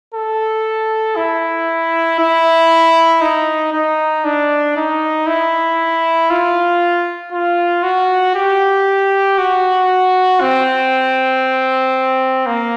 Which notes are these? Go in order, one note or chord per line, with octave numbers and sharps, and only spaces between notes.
A4
E4
E4
D#4
D#4
D4
D#4
E4
F4
F4
F#4
G4
F#4
C4
A#3